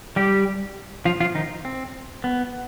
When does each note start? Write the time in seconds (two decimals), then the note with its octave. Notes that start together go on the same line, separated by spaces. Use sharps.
0.16 G3 G4
1.05 F3 F4
1.20 F3 F4
1.35 D#3 D#4
1.65 C4
2.24 B3